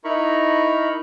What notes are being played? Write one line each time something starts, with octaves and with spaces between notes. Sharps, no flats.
D#4 E4 A#4 A#5 B5 C#6